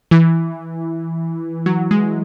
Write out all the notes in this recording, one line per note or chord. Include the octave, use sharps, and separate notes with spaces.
E3
F#3
G#3